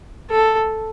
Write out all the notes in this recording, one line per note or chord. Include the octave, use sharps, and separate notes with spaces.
A4